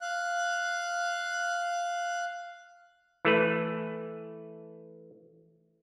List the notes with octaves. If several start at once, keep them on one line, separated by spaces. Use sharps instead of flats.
F5 F#6
E3 A3 B4